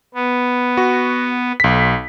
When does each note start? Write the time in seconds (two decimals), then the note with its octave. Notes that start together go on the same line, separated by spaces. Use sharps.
0.14 B3
0.77 F#4
1.60 B1 B6